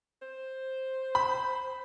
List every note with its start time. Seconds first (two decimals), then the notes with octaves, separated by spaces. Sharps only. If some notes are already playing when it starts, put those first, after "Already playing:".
0.22 C5
1.15 B5